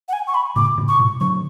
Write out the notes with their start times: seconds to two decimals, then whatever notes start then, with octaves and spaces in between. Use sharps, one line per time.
0.09 F#5
0.13 G#5
0.27 C#6
0.35 B5
0.56 A2 C#3 D6
0.78 A2 C#3
0.88 C#6
0.99 G#2 B2
1.20 D3 F#3 C#6